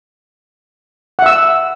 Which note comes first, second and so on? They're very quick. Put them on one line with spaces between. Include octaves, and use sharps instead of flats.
F#5 E5 E6